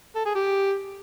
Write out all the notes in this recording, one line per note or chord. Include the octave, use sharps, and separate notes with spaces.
A4
G#4
G4